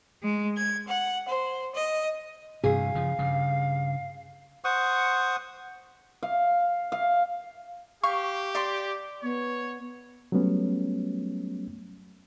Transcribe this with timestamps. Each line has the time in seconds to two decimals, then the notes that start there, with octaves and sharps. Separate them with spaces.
0.22 G#3
0.57 G#6
0.87 F#5
1.28 C5
1.75 D#5
2.64 G2 C3 E3 G#4 F5
2.95 C#3 F3
3.18 G2 C#3
4.64 C5 F#5 C#6 D#6
6.23 F5
6.92 F5
8.03 G4 F5 C#6
8.55 D5 C6 D6
9.23 B3 C#5
10.32 F#3 G3 A3 B3 C#4